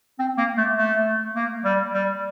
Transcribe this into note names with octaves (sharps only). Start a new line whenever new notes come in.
C4
A#3
A3
A3
A#3
G3
G3